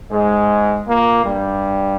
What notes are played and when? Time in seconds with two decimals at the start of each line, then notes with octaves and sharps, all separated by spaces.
0.11 G#2 G#3
0.87 A#2 A#3
1.24 G2 G3